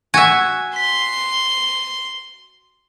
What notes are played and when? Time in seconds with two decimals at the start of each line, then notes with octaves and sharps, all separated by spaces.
0.14 F#4 E5 G#5 G#6
0.76 C6 B6